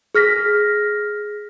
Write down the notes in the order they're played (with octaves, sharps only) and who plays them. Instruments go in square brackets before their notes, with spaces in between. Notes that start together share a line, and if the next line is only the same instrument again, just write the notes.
[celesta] G#4 F6 A#6 B6